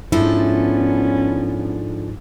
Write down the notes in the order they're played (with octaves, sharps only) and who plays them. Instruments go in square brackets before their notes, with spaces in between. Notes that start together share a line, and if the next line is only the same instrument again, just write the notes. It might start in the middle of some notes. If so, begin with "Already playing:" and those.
[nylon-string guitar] G#2 E4 [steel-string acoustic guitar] F3 D4 A4 [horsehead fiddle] B3 C#4